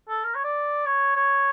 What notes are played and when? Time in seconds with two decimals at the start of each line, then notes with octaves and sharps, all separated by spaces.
0.08 A4
0.24 A#4
0.35 C#5
0.44 D5
0.85 C#5
1.16 C#5